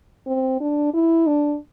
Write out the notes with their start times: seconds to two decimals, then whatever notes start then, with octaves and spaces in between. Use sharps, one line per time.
0.27 C4
0.60 D4
0.94 E4
1.27 D4